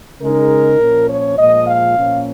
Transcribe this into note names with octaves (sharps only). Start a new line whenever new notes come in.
C#3 G#3 D#4 A#4
A#2 F3 C#4
C#5
A#2 F3 G#3 D#5
F5
A#2 F3 A#3 C#4